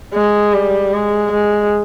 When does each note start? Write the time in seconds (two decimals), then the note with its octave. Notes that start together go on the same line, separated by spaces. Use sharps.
0.14 G#3
0.54 G3
0.93 G#3
1.32 G#3